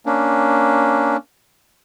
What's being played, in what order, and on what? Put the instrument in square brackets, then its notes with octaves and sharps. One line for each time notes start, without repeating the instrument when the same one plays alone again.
[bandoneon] A#3 C#4 D4